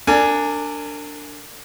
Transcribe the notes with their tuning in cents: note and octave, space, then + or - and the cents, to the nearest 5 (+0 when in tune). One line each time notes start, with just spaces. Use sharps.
D4 +0 A#4 -40 G#5 +0